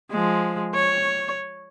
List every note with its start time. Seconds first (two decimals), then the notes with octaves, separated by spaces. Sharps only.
0.11 F3 G#3
0.74 C#5